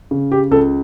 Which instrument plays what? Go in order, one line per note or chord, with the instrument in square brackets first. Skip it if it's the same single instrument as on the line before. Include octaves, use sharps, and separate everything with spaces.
[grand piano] C#3
G4
C#2 A4